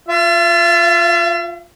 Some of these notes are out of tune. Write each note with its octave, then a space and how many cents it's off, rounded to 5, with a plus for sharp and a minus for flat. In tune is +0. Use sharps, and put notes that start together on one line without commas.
F4 +0 E5 +45